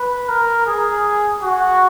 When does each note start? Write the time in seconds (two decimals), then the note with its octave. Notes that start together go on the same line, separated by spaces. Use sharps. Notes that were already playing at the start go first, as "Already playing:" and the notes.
Already playing: B4
0.29 A#4
0.67 G#4
1.42 F#4